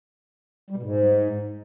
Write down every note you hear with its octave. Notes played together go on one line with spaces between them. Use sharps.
G3
B2
G#2